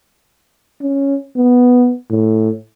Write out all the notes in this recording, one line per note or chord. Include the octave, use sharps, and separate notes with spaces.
C#4
B3
A2